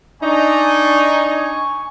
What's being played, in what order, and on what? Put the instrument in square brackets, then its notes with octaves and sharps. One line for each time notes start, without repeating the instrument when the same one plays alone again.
[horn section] D4 D#4 [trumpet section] G#5 C#6